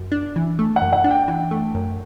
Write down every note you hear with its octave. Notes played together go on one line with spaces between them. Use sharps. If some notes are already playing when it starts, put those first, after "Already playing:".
Already playing: F#2
D4
E3
A3
F#5
F#2
F#5
D4
G5
E3
A3
F#2